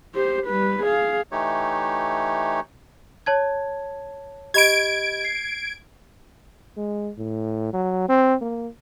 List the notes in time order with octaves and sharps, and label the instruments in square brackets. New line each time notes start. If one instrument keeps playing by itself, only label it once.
[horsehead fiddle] G4 C5
G3 B4
G#4 F5
[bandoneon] E3 A3 D#4 G4 C#5
[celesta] C#5 A5 G#6
[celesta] G4 D#5 B5 [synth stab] G#6 D7
[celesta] C7
[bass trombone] G#3
A2
F#3
C4
A#3